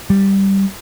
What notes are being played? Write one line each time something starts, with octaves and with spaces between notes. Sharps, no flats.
G3